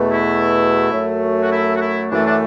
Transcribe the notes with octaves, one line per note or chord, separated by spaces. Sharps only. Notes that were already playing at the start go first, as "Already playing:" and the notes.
Already playing: E2 B2 A3
E4
F#2 F#3 A3
F#4
E4
F#4
E4
F#2 E3 A3 D4
D4